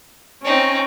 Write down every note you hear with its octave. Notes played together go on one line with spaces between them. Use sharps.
C4 C#4 D#4 C#5